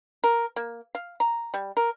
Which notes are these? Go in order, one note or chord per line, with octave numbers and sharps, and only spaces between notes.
A#4
A#3
F5
A#5
G3
A#4